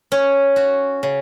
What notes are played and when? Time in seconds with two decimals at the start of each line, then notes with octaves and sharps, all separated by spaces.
0.12 C#4
0.56 F#4
1.03 C#3